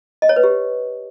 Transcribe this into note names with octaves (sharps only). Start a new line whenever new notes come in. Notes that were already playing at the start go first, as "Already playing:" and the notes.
D#5
C#5
B4
G4